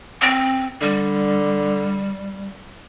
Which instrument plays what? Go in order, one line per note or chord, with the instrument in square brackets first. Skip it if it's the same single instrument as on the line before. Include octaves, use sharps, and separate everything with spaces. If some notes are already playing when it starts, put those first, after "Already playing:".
[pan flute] C4
[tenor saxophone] D3 [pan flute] G3